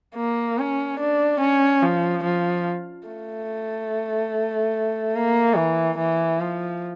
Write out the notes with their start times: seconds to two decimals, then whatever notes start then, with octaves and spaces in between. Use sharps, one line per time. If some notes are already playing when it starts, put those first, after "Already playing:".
0.16 A#3
0.59 C#4
1.00 D4
1.41 C#4
1.83 F3
2.24 F3
3.08 A3
5.16 A#3
5.56 E3
5.99 E3
6.40 F3